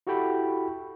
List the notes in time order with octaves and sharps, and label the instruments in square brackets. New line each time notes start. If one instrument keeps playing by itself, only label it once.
[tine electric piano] E4 F#4 G4 A4 G5 B5